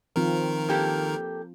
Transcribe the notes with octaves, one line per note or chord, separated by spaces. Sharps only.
D#3 F3 C4 F4 A#4
A#3 G4 A4